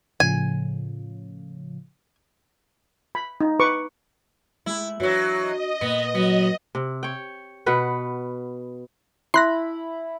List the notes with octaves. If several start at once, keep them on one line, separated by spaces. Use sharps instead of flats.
A2 C#3 F3 G#5
B5
D#4
B4 C#6 D6
G#3 A3 E4
E3 F#3 D4 F#4 C#5
D#5
A#2 B3
F#3 B3
C3
C#5 G5
B2 B4 F#5
E4 B5 C6 F#6 A#6